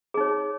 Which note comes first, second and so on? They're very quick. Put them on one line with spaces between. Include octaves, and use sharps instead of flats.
G#4 D#4 C#5